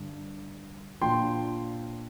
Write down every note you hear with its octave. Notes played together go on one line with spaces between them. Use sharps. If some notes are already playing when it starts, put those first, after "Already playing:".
Already playing: G2 D3
A#2 F3 D4 G5 C6